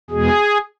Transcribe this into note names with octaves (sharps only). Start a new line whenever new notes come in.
E2 B2 G#3 G#4